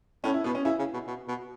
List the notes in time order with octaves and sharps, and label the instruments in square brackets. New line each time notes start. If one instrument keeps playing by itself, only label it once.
[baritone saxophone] A2 [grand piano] C#4
[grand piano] E4
[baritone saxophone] B2 [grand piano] B3
[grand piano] C#4
[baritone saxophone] C#3 [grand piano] E4
[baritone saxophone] C#3
B2
B2
B2